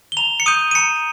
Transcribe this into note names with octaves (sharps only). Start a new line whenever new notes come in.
G7
A#5 F7
C#7
D#6 G6 D#7
D#7
A#5 C#7